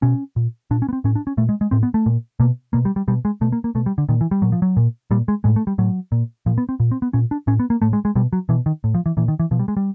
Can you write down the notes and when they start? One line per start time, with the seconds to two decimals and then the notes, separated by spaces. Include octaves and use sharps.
0.02 B2 C#4
0.36 A#2
0.71 A#2 D4
0.82 C#4
0.89 B3
0.93 C4
1.04 A2 C#4
1.15 D4
1.27 C#4
1.37 A#2 A3
1.49 G#3
1.61 G#3
1.71 A2 C4
1.83 B3
1.94 A3
2.06 A#2
2.40 B2 A#3
2.73 B2 A#3
2.85 G3
2.96 G3
3.08 B2 G3
3.25 G#3
3.41 B2 A3
3.52 A#3
3.64 A#3
3.75 B2 A3
3.86 G3
3.98 D3
4.09 A#2 D#3
4.21 E3
4.31 G3
4.42 A#2 F#3
4.52 F3
4.62 F#3
4.77 A#2
5.11 A#2 G3
5.28 G#3
5.44 A2 G#3
5.56 A3
5.67 G3
5.78 A2 F#3
6.12 A#2
6.46 A#2 F3
6.58 B3
6.69 C4
6.80 A#2
6.91 C4
7.02 B3
7.13 A#2 C#4
7.31 D4
7.47 A2 C#4
7.59 B3
7.70 A#3
7.82 A2 A3
7.93 G#3
8.05 G#3
8.15 B2 G3
8.33 F#3
8.49 B2 E3
8.66 D#3
8.84 A2
8.94 F3
9.06 E3
9.17 A#2 E3
9.28 D#3
9.40 E3
9.51 B2 F3
9.59 G3
9.68 G#3
9.77 G3